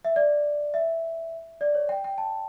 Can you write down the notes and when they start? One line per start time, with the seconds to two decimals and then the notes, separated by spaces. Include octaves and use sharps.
0.05 E5
0.16 D5
0.74 E5
1.61 D5
1.75 C#5
1.89 G5
2.04 G5
2.18 A5